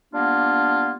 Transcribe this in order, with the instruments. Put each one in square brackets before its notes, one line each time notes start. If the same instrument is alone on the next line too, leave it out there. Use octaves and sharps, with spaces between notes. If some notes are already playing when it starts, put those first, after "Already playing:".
[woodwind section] G3 A#3 B3 D4 F4